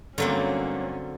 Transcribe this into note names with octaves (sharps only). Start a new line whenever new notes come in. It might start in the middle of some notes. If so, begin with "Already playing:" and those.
G2 D3 F#3 A3 A#3 C4 C#4